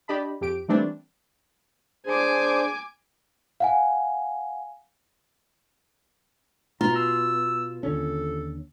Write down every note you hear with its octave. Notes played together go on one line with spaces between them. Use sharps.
D4 G4 D#5 A5 B5
F2 G4 D7
E3 G3 A3 C4 D4
D4 G#4 C5 G#5 D6
F5 F#5 G#5
B2 F4 A#5
E6
D#2 D3 C#4 A4